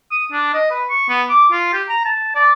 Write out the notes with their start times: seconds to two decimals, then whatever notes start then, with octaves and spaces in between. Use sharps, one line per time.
0.12 D#6
0.32 D4
0.54 D#5
0.70 B4
0.89 C#6
1.09 B3
1.30 D6
1.52 F4
1.73 G4
1.89 A#5
2.05 A5
2.35 D5